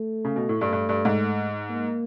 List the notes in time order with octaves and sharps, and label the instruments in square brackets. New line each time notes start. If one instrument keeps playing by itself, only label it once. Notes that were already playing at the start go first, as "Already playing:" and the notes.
Already playing: [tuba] A3
[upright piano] C#3
B2
A2
G2
G2
G2
G#2
[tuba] A#3